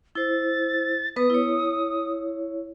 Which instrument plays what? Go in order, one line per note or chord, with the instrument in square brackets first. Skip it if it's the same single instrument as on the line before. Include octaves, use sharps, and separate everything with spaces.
[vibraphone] E4 C5 [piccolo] A6
[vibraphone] B3 B4 [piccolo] D#6
[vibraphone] E4 C#5